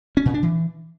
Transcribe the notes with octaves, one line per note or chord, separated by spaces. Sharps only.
C#4
A#2
D4
E3